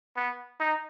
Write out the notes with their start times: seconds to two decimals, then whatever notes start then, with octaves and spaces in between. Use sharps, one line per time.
0.16 B3
0.60 D#4